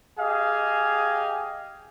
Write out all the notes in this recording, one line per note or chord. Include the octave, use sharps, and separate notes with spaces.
G4 G#4 D#5 F5 G#5